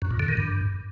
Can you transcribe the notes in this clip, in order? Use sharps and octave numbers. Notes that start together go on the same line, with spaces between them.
F#2
A#2
D3
D#3
G2